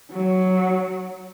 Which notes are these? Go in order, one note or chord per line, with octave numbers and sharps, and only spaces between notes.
F#3